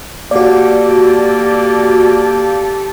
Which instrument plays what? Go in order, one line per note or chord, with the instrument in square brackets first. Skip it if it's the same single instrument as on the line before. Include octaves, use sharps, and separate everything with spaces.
[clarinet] A#3 [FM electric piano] F#4 D5 [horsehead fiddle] G4 A4